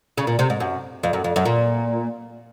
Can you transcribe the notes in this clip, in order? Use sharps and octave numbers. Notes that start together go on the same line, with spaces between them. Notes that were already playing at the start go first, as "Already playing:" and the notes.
C#3
A#2
C3
G#2
F#2
F2
F#2
F2
F#2
A#2